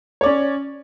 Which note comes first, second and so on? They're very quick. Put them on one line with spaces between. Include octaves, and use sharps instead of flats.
C#5 D5 C#4